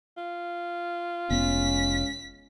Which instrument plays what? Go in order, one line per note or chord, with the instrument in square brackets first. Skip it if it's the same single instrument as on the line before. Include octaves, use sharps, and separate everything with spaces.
[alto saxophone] F4
[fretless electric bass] F1 B3 [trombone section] G#3 C#4 [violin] B6